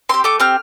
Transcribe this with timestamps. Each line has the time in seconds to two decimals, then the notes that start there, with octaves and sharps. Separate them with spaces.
0.09 C4 G4 C6
0.24 A3 D6
0.40 C4 G4 F6